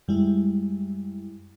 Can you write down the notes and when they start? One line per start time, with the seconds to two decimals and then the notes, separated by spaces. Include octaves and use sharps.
0.08 F#2 G3 G#3 E4